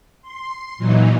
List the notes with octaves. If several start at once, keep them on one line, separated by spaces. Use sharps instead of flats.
C6
A#2 E3 F#3 D#4